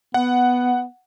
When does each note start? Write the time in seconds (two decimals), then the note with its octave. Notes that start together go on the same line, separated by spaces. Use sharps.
0.14 B3 F#5